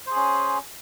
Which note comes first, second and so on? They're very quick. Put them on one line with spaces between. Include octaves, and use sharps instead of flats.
C5 G#4 C#4